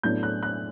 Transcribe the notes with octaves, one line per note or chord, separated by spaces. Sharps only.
A2 F#3 B3 D4 G6
F#6
F#6